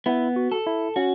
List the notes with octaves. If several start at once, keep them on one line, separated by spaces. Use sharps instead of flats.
B3 E4
F#4
A4
E4
C#4 F#4